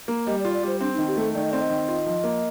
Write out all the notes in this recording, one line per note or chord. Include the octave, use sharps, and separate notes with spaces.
A#3
G3 D#5
D5
F4
D5
G3 C5
C4 D4
D#4
D#3
G4
A3 A4
D#3 D5
D#5
C4 D5
D#5
D#3
F4
F3
A#3